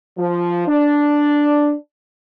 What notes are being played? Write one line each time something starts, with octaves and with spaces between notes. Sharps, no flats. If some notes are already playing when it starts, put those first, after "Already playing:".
F3
D4